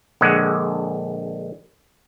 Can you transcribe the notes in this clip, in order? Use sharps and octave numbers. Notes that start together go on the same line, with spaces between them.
A#1 D3 G#3 F#5